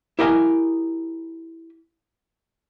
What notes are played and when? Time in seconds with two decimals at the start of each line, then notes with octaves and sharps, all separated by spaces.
0.19 E4 G4 A#4 D#5 F5 G#5